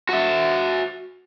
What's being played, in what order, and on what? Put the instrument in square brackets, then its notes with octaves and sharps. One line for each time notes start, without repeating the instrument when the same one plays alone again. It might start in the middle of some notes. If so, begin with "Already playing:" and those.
[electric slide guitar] F#4 E5